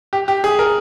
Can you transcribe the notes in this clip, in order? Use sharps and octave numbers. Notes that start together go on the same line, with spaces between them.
G4
G4
G#4
A#4